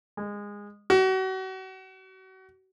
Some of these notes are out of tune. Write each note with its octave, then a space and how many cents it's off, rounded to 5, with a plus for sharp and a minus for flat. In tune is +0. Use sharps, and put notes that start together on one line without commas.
G#3 -20
F#4 +35